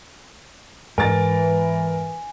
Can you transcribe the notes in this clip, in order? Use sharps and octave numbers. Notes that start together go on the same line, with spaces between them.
G#2 E3 A#4 G#5 A6